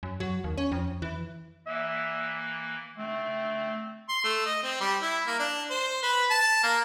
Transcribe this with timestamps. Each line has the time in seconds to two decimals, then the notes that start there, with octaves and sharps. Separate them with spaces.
0.03 F#2
0.20 F#3
0.44 D#2
0.57 C#4
0.72 F2
1.02 E3
1.66 E3 A#3 E5
2.97 A3 C4
4.09 C6
4.24 A3
4.46 D#5
4.63 C4
4.80 G3
5.02 E4
5.27 A#3
5.39 D4
5.70 C5
6.03 B4
6.30 A5
6.63 A#3